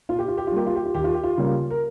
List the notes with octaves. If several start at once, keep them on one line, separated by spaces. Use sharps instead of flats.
A#2 F4
G4
F4
G4
F4
G3 A#3 G4
F4
G4
F4
D#2 G4
F4
G4
F4
C#3 G3 A#3
A#4